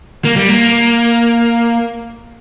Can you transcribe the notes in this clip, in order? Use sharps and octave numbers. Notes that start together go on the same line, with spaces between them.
A#3
G3
A#3